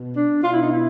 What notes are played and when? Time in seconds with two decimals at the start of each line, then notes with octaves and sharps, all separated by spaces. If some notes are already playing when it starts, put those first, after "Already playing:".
Already playing: B2
0.17 D4
0.43 B2 F4
0.53 E4
0.62 D#4
0.72 E4